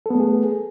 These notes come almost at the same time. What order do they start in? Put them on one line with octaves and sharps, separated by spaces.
A4 B3 A3 G#4